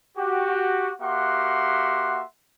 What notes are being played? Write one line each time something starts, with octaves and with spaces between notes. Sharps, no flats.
F#4 G4
A#3 F#4 G4 E5 F#5 C6